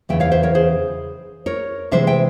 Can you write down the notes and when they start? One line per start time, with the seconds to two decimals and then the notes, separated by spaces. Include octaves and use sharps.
0.09 E2 C#3 E3 E5 G5
0.20 C#5 F5
0.32 C5 E5
0.43 A#4 C#5
0.55 G#4 C5
1.46 A#4 C#5
1.91 C3 E3 G#3 C5 E5
2.07 E5 G5